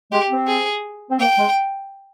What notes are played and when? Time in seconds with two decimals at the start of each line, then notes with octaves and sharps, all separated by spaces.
0.12 G#3 G4
0.30 C4
0.48 G#4
1.09 C4
1.19 A#3 G5
1.38 G#3